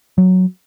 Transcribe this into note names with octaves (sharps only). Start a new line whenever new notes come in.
F#3